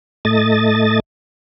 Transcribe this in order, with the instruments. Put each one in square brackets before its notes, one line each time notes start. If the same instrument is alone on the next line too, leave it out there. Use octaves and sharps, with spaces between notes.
[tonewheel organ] A2 A3 D#5 A6